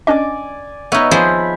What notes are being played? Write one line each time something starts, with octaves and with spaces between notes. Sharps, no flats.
C#4 D4 D5 D#5 G#5 D6
B3 D#4 C#5 E5 F5
F3 G#4 C5 B5